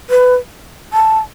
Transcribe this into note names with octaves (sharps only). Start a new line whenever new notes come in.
B4
A5